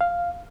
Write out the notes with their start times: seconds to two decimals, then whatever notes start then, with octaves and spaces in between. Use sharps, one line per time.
0.01 F5